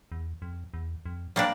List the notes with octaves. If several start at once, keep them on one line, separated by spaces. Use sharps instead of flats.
E2
F2
E2
F2
G3 A#3 D4